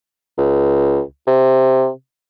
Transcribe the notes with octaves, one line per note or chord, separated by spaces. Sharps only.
C#2
C3